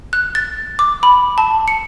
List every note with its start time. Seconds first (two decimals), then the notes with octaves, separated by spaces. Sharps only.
0.13 F#6
0.35 A6
0.79 D6
1.03 B5
1.38 A5
1.68 C#7